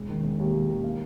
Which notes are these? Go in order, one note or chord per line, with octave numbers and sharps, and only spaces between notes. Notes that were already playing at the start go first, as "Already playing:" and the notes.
Already playing: E1
D#3
E1
D#2
E1
D#3
A#3